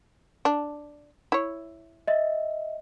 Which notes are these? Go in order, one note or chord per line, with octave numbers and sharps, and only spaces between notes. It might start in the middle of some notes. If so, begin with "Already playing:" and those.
D4
E4 C#5
D#5 E5